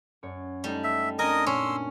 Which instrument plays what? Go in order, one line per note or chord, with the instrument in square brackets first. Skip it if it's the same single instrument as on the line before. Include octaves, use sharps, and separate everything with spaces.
[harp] F#2 C#5
[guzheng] G3 [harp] A3 D#4
[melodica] E5
[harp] C4 D4 [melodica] A#4 D#5 D#6 [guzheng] G#5
[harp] A#2 [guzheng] C#4 [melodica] C6 E6